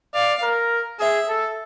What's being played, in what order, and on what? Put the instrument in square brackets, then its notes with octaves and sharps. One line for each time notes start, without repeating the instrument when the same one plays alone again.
[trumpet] D5 [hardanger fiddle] F5
[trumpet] A#4
[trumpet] G#4 [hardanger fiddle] E5
[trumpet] A4